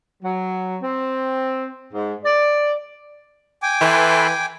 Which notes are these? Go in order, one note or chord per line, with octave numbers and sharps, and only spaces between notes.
F#3
C4
G#2
D5
G5 G#5 D6
E3 A4 B4 C6